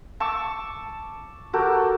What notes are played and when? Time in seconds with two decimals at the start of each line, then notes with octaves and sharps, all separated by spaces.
0.20 A5 C#6 D6 E6
1.53 F#4 G4 A4 A#4